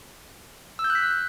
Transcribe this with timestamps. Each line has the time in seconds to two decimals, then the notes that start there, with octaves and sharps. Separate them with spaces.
0.79 E6
0.84 G6
0.90 F#6
0.95 B6